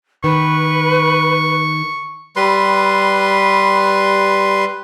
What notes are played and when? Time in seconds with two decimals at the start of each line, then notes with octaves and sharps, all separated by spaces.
0.24 D#3 B4 C#6
2.36 G3 B4 C6